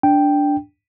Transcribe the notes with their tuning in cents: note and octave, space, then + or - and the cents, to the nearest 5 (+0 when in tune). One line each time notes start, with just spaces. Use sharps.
D4 -5 G5 +0